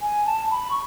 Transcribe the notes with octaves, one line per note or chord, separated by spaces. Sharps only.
G#5
A5
A5
B5
C#6